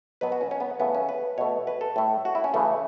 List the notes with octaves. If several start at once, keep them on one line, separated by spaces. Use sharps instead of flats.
B2 F#3 B3 B4
F#4
C#4
C#4
B3
C#3 E3 A3 B3
C#4
B4
B2 A3 C#5
B4
A4
A2 A3
F#4
E4
C#4
C#3 E3 A3